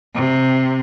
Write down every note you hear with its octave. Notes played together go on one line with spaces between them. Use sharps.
C3